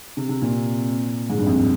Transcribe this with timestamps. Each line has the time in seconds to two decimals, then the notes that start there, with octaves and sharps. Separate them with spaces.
0.17 C3
0.29 C3
0.42 A#2
1.30 G#2
1.38 G2
1.47 F2